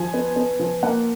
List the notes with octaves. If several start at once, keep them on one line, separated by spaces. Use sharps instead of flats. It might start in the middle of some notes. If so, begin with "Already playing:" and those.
Already playing: F3 G#5
B3
B3
F3
A#3 F#5